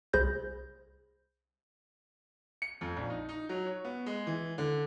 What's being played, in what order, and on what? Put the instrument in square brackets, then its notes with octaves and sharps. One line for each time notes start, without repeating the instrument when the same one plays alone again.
[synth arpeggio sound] C2 G#4 C5 B5 G6 A#6
[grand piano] C#7
F2
A#1
D#4
D#4
F#3
C#5
B3
G#3
E3
D3